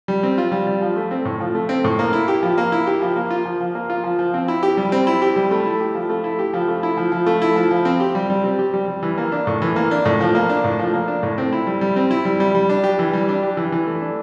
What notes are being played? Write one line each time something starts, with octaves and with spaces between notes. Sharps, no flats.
G3
C4
F4
G3
G3
F3
A3
C4
A2
F3
A3
C4
A2
A#3
E4
G4
F3
A#3
E4
G4
F3
A#3
F4
F3
F3
A#3
F4
F3
F3
C4
E4
G4
G3
C4
E4
G4
G3
A3
E4
G4
F3
A3
E4
G4
F3
A3
E4
F3
F3
A3
E4
F3
F3
C4
G4
G3
G3
C4
G4
G3
G3
E3
A#3
D4
A2
E3
A#3
D4
A2
F3
A#3
D4
A2
F3
A#3
D4
A2
C4
E4
G3
G3
C4
E4
G3
G3
G3
D4
G4
E3
G3
D4
G4
E3
E3
A3
D4